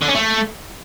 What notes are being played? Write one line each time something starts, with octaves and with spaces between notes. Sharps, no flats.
D3
C#4
A3